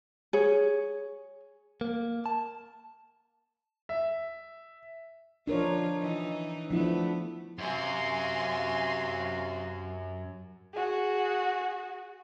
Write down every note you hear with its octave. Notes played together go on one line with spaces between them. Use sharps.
G#4 C#5
A#3
A5
E5
F3 D4 D#4 F4 A#4 C#5
E3 D#4
F3 A3 B3 D4 E4
F#2 C3 F#4 F5 G#5 C6
F#4 G#4